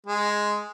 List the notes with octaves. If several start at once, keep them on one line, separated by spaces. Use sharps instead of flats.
G#3